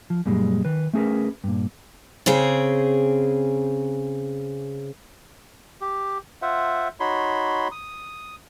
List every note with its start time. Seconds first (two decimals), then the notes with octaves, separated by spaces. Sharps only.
0.10 F3
0.26 F#2 A#2 G3 G#3
0.65 D#3 B4
0.93 A3 C#4 G#4 A#4 B4
1.44 G2 A#2
2.26 C#3 C4 G#4
5.81 G4
6.42 F4 C5 E5 F#5
7.00 D#4 F#4 C#5 B5 C6
7.72 D#6